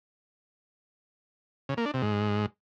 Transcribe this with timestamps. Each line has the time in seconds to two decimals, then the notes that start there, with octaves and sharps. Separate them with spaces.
1.69 C#3
1.77 A#3
1.86 D4
1.94 C3
2.02 G#2